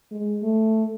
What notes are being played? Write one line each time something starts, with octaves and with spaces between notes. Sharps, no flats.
G#3
A3